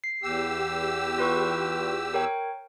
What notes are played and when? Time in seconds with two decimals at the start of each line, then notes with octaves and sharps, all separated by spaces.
0.04 C7
0.23 E2 G4 E6
1.18 F4 B4 C#6
2.14 A#4 C#5 G5